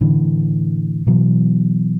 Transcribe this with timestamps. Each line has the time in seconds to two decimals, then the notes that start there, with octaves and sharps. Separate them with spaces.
0.01 A2 D3 E3
1.07 B2 E3 F#3